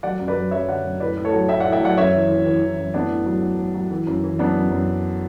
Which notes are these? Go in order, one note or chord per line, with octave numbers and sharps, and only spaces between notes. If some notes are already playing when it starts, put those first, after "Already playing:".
F#3 D5 F#5
F#2
B4 D5
F#3
F#2 C#5 E5
D3 D5 F#5
F#2
A2 B4 D5
A2
A4 C#5
F#3
A2 E5 G5
D5 F#5
A2
E5 G5
F#3 D5 F#5
F#2 C#5 E5
E3
E3
E3
E3
F#2
A2 B3 D4
A2
F#3
F#3
F#3
F#3
E3
F#2
E3
F#2 B3 D4
F#2
F#2